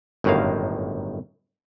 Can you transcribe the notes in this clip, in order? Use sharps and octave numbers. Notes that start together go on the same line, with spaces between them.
G1 F#2 A2 D#3 A#3 F5